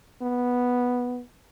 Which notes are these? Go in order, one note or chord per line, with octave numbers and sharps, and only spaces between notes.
B3